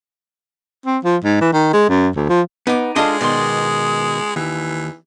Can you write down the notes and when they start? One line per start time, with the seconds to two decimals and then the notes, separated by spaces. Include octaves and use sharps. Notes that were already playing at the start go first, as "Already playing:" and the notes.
0.86 C4
1.04 F3
1.24 G#2
1.41 E3
1.53 D#3
1.73 G#3
1.89 F#2
2.16 D2
2.29 F3
2.67 B3 D#4 D6
2.96 G#3 D4 F4 A4 D#5 D#6
3.21 B2 D#3 D5 C6 D#6
4.36 D#2 E3